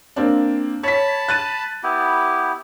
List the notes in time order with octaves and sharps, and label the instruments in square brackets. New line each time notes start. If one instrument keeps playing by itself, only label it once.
[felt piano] A#3 C4 D4
[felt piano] C#5 B6 [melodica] A5 B5
[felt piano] F#6 A6 D#7
[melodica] B3 E4 G4